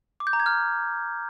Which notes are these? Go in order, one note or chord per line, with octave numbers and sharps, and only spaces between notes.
D6
G6
A#5
G#6
F6